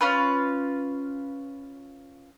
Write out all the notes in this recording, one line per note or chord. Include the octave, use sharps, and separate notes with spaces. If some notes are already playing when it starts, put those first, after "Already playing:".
C#4 F4 B4